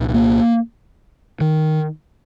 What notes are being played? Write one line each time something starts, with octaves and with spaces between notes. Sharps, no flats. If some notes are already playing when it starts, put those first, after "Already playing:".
Already playing: C2 A#2
A#3
D#3